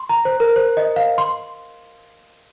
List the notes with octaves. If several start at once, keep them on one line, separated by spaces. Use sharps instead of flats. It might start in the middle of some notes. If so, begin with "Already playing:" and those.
Already playing: C6
A#5
C5
A#4
C5
D#5
F5
C6